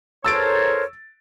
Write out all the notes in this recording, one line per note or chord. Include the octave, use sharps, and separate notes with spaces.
E2 A4 A#4 C5 C#5 E6 A6 D7